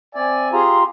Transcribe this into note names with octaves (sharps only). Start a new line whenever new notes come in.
C4 D5 E5 G#5
F4 G4 G#4 A#5 C6